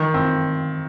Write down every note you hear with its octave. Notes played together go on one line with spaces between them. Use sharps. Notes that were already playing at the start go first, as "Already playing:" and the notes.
Already playing: D#3
C4